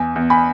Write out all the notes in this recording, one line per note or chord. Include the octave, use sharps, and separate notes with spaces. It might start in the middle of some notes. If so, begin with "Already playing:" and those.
Already playing: E2 G#5
E2
G#5 B5